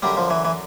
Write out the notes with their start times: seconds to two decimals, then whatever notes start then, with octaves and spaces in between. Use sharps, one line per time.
0.02 F#2 D3 G3
0.17 F3
0.30 E3
0.45 E3